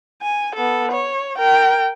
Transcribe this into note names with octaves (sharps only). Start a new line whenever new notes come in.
G#5
B3 A4
C#5
A#4 G5